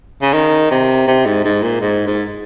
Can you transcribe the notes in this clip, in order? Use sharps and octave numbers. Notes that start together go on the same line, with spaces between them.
C#3
D#3
C3
C3
G#2
G#2
A#2
G#2
G#2